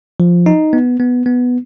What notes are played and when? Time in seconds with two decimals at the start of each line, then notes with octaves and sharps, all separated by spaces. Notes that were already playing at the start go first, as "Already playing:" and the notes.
0.20 F3
0.46 D#4
0.73 B3
1.00 B3
1.26 B3